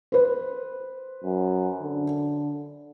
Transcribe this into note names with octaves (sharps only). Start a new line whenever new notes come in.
B4 C5
F#2
D3